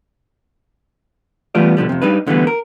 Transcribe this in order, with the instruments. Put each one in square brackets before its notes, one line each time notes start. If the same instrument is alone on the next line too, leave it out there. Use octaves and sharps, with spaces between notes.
[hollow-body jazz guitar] E3 G3 A3 B3 F4 D5
B2 D3 F3 G3
F2 C3
G3 D4 D#4 B4
D2 D3 E3 G3 B3
A#4